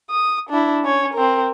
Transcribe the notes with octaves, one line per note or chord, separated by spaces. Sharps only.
D#6
D4 E4
C#4 C#5
C4 A#4